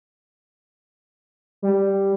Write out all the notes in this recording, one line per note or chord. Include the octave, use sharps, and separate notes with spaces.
G3